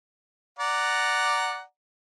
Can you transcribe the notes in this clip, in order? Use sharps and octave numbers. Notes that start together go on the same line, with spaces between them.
D5 F#5 A#5